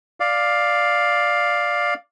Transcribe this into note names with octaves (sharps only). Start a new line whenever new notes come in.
D5 F5